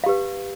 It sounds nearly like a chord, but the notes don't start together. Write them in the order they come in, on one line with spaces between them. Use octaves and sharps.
F5 G4 B4